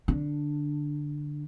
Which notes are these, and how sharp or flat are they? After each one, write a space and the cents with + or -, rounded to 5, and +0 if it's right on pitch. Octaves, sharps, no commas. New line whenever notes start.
D3 +0 D4 +5